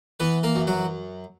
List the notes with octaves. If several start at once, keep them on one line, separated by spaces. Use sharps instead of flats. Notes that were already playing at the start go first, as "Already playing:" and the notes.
E3 B3 B4
A#3 A#4
F#2
F#3 F#4